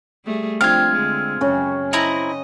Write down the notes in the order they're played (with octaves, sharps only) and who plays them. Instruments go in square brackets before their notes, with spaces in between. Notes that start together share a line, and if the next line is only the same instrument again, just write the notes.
[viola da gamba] G3 A3 G#4
[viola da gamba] F3 D4 [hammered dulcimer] C4 [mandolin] F4 F5 [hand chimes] F6 G#6
[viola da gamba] D3 G#3
[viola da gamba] F#2 [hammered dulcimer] C#3 C#4
[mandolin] C4 E4 A#5 [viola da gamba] D#5